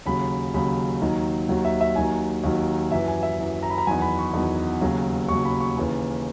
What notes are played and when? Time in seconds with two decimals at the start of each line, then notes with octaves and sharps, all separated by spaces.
0.06 D#2 C#3 F#3 B5
0.54 D#2 C#3 F#3 B5
1.02 D#2 D#3 F#3
1.49 D#2 D#3 F#3
1.65 E5
1.81 E5
1.96 D#2 D#3 F#3 G#5
2.44 D#2 D#3 F#3
2.91 F#2 E3 E5
3.07 G#5
3.23 E5
3.39 F#2 E3
3.63 A#5
3.70 B5
3.78 A#5
3.87 E2 D#3 F#3 G#5
4.02 B5
4.18 C#6
4.33 E2 D#3 F#3
4.81 D#2 C#3 F#3
5.29 D#2 C#3 F#3 C#6
5.45 B5
5.60 C#6
5.77 D#2 C#3 E3